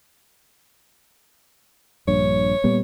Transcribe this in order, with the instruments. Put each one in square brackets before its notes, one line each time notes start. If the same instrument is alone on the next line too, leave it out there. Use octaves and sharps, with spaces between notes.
[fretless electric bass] A#1 G2 [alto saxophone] C#5
[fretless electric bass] A#2 G3 B3